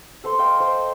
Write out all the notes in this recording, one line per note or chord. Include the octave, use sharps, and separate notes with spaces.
A4 C5 C6
C5 D#5 F5 G5
C5